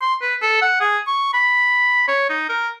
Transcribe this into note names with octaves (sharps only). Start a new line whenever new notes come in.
C6
B4
A4
F#5
G#4
C#6
B5
C#5
D#4
A#4